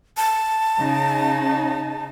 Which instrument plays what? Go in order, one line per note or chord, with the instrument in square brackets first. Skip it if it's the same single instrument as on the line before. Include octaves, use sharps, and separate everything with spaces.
[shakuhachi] A5
[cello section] C#3 D#4